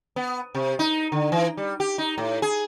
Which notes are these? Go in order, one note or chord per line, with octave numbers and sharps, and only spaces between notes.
B3
C3
D#4
D3
E3
G3
G4
D#4
A2
G#4